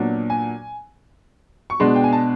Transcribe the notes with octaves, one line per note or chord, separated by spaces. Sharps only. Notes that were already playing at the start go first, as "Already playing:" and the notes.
Already playing: A#2 F#3 B3 D4
G#5
C#6
B2 G#3 B3 D4 C6
G5
G#5
A5